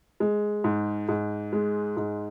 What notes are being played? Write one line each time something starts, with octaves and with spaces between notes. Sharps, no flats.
G#3
G#2
G#2
G#3
G#2